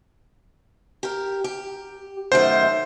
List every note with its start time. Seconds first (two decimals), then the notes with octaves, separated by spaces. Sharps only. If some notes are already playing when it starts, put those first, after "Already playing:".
1.03 G4 A#4
1.44 G4
2.32 F#2 D#3 A3 C5